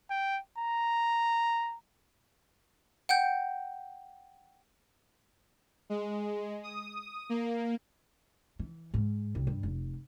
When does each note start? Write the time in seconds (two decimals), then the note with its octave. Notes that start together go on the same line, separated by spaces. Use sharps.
0.10 G5
0.58 A#5
3.09 F#5 G5 G6
5.90 G#3
6.63 D#6
7.29 A#3
8.59 E3
8.94 G#2
9.35 C2
9.47 G2
9.63 F1